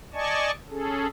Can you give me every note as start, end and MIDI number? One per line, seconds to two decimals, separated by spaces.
0.14 0.51 74
0.14 0.51 75
0.14 0.51 80
0.14 0.51 81
0.14 0.51 85
0.70 1.07 61
0.70 1.07 68
0.70 1.07 69